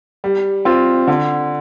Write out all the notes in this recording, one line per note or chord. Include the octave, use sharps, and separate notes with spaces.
G3
C4 F4
D3